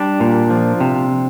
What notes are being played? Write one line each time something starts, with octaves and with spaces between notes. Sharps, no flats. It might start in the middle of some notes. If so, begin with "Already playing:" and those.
Already playing: G3 D4
A#2
F3
C3